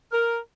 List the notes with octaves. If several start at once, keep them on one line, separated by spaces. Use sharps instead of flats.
A#4